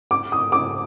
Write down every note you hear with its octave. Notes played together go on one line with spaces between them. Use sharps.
D6
D#6
D6